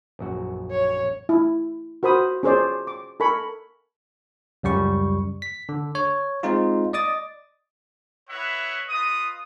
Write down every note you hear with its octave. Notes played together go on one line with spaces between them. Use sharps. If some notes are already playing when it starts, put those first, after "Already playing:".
A#1 F#2 F#4
C#5
E4
F#4 A#4 C5 B5 D#6
C#4 G#4 C5 D5
D6
A4 A#4 G#5 B5 C#6
C#2 F#2 G3 C#6
B6
D3
C#5
G#3 C4 D#4 F4
D5 D#5 D6 D#6 A6
E4 B4 C#5 D#5 E5 F#5
F4 B4 D#5 D#6